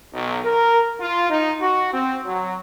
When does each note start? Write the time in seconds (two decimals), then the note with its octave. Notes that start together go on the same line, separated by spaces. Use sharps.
0.14 B1
0.45 A#4
1.01 F4
1.30 D#4
1.61 F#4
1.94 C4
2.26 F#3